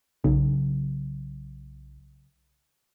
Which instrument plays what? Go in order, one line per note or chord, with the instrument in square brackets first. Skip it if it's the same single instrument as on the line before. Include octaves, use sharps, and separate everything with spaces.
[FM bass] B1 [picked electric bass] C#3 F#3